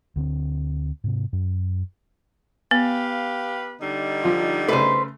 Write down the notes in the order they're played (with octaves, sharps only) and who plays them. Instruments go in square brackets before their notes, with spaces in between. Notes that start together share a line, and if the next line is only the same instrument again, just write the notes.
[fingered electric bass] D2 D3 C4
G#2 C3
F#2
[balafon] B3 [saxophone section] G4 B4 F5
[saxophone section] D3 G3 D#4
[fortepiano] F3 F4
[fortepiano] C#3 A3 [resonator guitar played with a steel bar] B4 C5